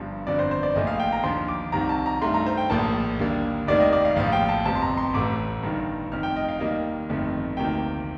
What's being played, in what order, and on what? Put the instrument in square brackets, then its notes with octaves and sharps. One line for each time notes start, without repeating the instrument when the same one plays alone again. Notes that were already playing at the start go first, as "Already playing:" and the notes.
Already playing: [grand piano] G1 G2 F3
G1 F2 D3 D5
C5
C5
D5
A#1 A#2 F3 A3 D#5
F5
G5
A#5
D#2 D3 F3 C6
D6
C2 C3 D#3 A#5
A5
A#5
G2 D#3 A3 C6
A#5
C5
G5
A#1 A2 F3 A#3 A5
D#2 D3 G3 A#3
F1 D#2 D#3 G3 A#3 D5
D#5
D5
F5
A#1 A2 F3 F5
G5
A5
G1 F2 C3 A5
C6
A#5
C6
A1 A2 A3 D6
G1 G2 D#3
F1 F2 D#3 F6
G5
D#5
F5
D#2 D#3 G3 A#3 D#5
G1 F2 D#3 A3
D2 C3 D#3 A#3 G5